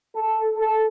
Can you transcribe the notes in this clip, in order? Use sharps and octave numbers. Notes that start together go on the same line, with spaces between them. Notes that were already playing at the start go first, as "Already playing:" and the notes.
A4
A4